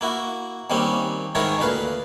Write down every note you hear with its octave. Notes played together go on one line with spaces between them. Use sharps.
A#3 E4 F#4
D#2 G3 A#3 C4 C#4
G#2 D#3 G#3 E4 A#4 C#5
D2 A#2 B4 F5